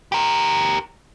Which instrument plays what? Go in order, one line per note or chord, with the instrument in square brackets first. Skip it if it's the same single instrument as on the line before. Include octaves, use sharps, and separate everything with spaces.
[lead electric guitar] G4 A#4